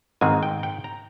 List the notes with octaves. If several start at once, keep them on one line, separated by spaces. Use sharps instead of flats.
G#2 D#3 G#3 C4 G#5
G5
G5
A#5